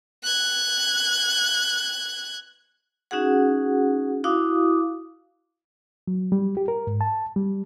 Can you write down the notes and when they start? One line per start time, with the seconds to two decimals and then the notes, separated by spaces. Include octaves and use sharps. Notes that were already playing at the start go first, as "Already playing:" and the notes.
0.23 F#6 G#6
3.11 C#4 D#4 F#4 G#4 F#5
4.24 E4 F#4 F5 D6 D#6
6.08 F#3
6.32 G3
6.57 G4
6.68 A#4
6.87 G#2
7.01 A5
7.36 G3